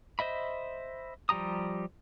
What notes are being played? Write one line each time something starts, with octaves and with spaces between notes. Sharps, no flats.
C5 D#5 E5 B5
F3 G3 G4 A#5 D#6